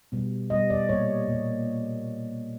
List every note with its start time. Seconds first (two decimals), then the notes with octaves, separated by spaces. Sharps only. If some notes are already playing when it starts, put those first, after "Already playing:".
0.12 B2 G3 B3
0.50 B2 G3 B3 D#5
0.70 D5
0.89 A#2 G3 A#3 C#5
1.28 A#2 G3 A#3